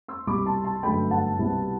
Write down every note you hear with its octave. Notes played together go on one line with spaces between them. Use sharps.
C6 E6
C2 B2 G3 B5 D6
A5 C6
A5 C6
G1 F#2 F#3 A3 D4 G5 B5
F#5 A5
C2 B2 G3 B3 E4